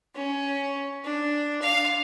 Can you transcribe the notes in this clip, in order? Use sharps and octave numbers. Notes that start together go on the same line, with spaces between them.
C#4
D4
F5